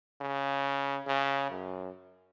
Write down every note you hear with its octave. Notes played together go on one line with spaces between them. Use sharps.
C#3
C#3
F#2